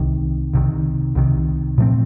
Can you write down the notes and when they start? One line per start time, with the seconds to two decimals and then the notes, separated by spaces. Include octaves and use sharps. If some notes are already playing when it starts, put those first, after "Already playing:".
Already playing: C2 C3 D#3
0.53 C2 C3 D#3
1.15 C2 C3 D#3
1.78 A#2 F3 A3 C4